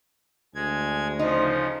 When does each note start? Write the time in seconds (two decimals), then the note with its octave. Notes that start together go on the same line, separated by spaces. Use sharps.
0.55 D2 G#3 G#6
1.19 C#3 F3 D#4 C5